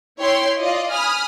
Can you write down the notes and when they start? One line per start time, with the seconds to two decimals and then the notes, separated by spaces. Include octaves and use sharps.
0.20 E4 C#5 G5 C6
0.58 F4 D5 D#5
0.92 G#5 B5 D#6 F6